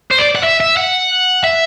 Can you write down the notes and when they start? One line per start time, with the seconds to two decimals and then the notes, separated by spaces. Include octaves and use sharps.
0.11 C5
0.18 D5
0.35 F#5
0.43 E5
0.60 E5
0.77 F#5
1.44 E5